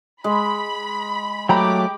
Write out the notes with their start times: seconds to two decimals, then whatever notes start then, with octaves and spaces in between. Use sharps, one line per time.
0.24 G#3 B5
1.49 F#3 A3 G4 G5 A#5 B5 D6